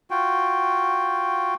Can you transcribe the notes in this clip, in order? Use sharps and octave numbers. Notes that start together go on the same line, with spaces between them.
F4 F#4 G5